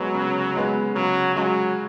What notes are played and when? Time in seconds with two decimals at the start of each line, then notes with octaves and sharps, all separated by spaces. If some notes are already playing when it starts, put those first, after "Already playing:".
Already playing: C#3 F#3 G#3 B3
0.14 C#3
0.55 G#3 B3
0.96 C#3 F#3
1.36 F#3 G#3 C#4 F#4